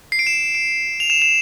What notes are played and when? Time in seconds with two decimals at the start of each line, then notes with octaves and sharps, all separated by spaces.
0.12 C7
0.19 D7
0.27 E7
0.55 D7
1.00 F7
1.10 E7
1.22 E7